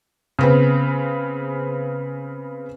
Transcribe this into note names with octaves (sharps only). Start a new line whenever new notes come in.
C#3 B3 C4